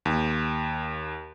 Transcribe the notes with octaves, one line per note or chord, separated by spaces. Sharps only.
D#2